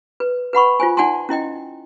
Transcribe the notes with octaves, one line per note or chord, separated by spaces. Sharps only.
B4
B4 F#5 B5 C#6
F4 C5 G#5
D#4 D5 F#5 G#5 A5 C6
C#4 E4 D#5 G5